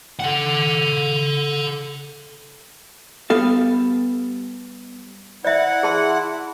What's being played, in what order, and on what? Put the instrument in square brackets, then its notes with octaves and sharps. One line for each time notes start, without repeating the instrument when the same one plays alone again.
[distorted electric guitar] A4 F#5
[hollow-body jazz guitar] G3 B3 A4 F5
[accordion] E4 F#5 [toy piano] D5 E5
[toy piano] G#4 A5 C6